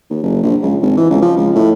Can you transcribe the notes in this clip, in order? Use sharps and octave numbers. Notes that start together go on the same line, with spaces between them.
D#2
F#1
A#1
C#2
G#1
E3
C#2
F3
C#2
A2